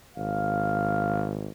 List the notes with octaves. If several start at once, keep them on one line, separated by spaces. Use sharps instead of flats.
G#1 F5